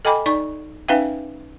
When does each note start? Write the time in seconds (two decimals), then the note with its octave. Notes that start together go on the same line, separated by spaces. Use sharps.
0.05 A4 D#5 G5 G#5 B5 D6
0.26 D#4 D5 C#6
0.88 C#4 D#4 B4 E5 F5 G5